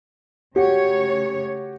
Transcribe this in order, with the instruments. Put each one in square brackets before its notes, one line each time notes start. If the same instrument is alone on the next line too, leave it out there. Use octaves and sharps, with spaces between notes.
[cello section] C#3 A3 C#5 [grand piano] F#4 G4